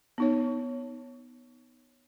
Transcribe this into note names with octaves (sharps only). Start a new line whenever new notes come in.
B3 D#4 C#5